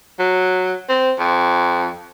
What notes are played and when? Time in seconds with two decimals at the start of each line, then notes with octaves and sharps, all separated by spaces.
0.19 F#3
0.89 C4
1.19 F2